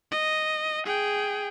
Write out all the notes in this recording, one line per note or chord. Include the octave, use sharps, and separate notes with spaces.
D#5
G#4 G5